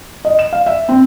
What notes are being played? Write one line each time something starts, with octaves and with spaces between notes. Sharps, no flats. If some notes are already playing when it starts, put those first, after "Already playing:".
D#5
E7
F5
E5
C4